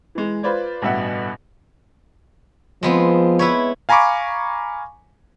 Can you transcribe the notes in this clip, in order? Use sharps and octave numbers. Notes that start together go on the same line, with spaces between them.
E3 G#3
F4 B4 C5 D5 G#6
A1 G2 B2 B3 E5 F#5
F3 G#3 B3 C4
E4 B4 C#5
F5 G#5 A#5 B5 C#6 D6